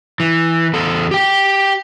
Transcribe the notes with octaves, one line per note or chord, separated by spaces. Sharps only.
E3
E2 A4
G4 G5